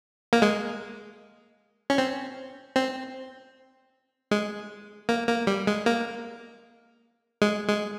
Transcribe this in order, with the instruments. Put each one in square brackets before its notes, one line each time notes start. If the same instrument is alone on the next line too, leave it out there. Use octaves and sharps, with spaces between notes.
[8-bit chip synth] A#3
G#3
C#4
C4
C4
G#3
A#3
A#3
G3
G#3
A#3
G#3
G#3